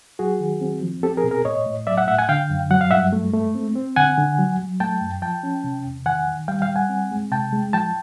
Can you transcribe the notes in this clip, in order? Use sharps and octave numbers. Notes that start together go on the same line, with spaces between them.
F#3 F#4 G#4
D#3
C4
F3
C4 G4 A4
G#4 A#4
B2
G#4 A#4
A2 C#5 D#5
A2
F#3 D5 E5
E5 F#5
A2 E5 F#5
F#5 G#5
D3 F5 G5
F#2
F#3 F#5
F5
G2 E5 F#5
A3
A3
C4
C4
D3 F#5 G#5
D3
F#3
F#3
A3 G5 A5
F#2
F3 G5 A5
C#4
C3
E2
D#3 F#5 G#5
D#3
G3 F5 G5
F5 G5
G3
F#5 G#5
C4
G#3
C3 G5 A5
G#3
F3 G5 A5